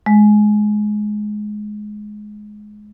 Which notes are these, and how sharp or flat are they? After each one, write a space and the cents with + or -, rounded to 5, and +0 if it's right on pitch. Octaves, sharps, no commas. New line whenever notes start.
G#3 +15